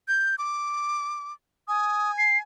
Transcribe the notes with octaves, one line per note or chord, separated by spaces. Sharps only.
G6
D6
G#5 D#6
C7